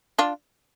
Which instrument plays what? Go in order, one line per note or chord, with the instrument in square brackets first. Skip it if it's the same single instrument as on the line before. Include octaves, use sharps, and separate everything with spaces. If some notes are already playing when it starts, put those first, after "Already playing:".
[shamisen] D4 F4